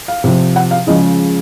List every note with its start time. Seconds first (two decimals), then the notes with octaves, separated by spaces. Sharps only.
0.08 F5
0.24 C3 F3 C4
0.56 F#5
0.71 F5
0.87 C#3 F3 G#3 C#4 D#5